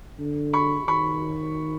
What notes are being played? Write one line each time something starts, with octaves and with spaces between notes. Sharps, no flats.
D3
B5 C#6
D#3 B5 C#6